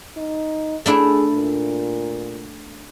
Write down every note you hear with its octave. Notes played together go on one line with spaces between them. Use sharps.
D#4
A3 D4 E4 G#4
A#2